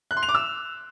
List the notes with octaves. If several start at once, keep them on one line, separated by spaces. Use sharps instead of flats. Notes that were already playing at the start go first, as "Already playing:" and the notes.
F#6
C6
F7
D6
E6